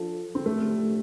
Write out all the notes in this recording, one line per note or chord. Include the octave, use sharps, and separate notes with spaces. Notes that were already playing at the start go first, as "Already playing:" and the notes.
Already playing: F3 D4 F4 A4
C4
A2 F3 A3 D4 G4